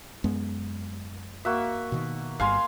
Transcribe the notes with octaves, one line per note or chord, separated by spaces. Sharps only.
F#2 G#3 B3
A#3 F#4 E5
B2 D#3
G1 G2 F5 G#5 C6